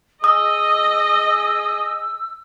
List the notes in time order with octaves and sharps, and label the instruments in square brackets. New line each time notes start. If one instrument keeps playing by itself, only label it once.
[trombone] G#4 [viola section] D#5 [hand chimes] D#6 [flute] E6